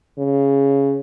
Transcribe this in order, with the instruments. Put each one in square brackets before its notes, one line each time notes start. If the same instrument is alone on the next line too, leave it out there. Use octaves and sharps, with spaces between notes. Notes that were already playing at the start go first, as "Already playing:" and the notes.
[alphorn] C#3